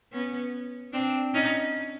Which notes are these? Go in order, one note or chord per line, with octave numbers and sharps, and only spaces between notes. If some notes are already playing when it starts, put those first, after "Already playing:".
B3 C#4
C4 D4
C#4 D#4